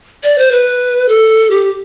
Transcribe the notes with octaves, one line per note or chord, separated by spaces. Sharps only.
D5
C5
B4
A4
G4